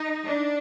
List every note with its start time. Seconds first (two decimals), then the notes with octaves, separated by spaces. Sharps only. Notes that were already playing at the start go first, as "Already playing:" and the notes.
Already playing: D#4
0.25 D4